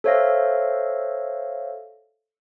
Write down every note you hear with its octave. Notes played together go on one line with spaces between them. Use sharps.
A4 C5 C#5 E5 F5 A#6